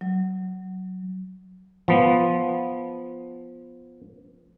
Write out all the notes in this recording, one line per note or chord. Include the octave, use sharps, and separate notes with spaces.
F#3
F3 B3